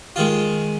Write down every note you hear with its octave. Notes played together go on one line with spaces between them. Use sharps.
D#3 G#3 F4